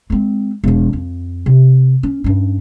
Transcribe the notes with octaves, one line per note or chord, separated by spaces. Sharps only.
G#3 C4
E1 F3
F2
C3
C#4
G2 C#4